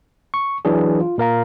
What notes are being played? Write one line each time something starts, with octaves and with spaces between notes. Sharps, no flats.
C#6
E3 F#3 D4 G#4
F4
A#2 A#4 F5 A#5